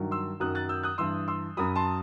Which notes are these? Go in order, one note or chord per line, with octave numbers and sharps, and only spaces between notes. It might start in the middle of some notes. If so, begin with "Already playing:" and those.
Already playing: G2 D#3 F#3
C6 E6
F#2 D#3 F#3 D#6 F#6
F#6 A6
E6 G6
D#6 F#6
G2 E3 C6 E6
C6 E6
F#2 F#3 B5 D#6
A5 C6